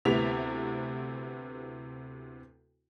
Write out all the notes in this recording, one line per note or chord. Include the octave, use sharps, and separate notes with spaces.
D2 C3 B3 E4 B6 F7